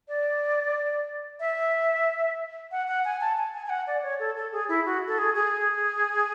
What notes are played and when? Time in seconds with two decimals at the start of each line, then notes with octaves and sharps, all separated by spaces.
0.08 D5
1.40 E5
2.71 F#5
2.88 F#5
3.05 G#5
3.21 A5
3.38 G#5
3.53 G#5
3.66 G#5
3.70 F#5
3.87 D5
4.03 C#5
4.19 A4
4.36 A4
4.52 G#4
4.69 E4
4.86 F#4
5.07 A4
5.18 G#4
5.35 G#4